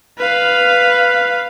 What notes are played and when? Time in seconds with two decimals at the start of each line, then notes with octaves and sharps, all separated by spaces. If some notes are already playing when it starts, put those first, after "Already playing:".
0.18 B4 F5